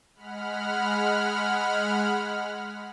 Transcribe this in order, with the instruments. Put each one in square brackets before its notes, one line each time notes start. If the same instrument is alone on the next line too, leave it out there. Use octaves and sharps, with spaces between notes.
[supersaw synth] G#3 F#5 B5 F6